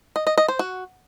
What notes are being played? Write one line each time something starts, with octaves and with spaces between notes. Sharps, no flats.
D#5
D#5
D#5
C5
F#4